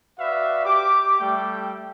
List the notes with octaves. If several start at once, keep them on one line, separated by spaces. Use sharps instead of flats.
F#4 B4 D5 E5 F5
G4 D6
G3 A3 G5